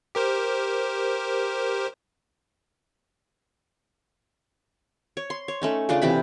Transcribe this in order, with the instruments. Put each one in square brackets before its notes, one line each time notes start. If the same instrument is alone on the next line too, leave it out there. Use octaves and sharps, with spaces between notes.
[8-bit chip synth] G4 A#4 C5
[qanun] C#5
C6
C#5
A3 C#4 D#4
C#3 D4 F4 D5
C3 E3 B5